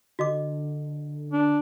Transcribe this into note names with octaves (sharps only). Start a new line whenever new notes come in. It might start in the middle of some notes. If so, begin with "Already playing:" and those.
D3 F#4 D#5 D6
D4